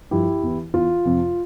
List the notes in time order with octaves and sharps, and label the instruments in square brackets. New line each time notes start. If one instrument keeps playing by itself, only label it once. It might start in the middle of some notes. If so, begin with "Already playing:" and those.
[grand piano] G2 F3 E4 G4
E2 E3
E2 E3 F4
F2 C3 F3